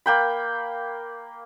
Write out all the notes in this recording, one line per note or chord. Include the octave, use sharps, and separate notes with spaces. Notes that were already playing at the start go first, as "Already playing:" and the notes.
A#3 G5 B5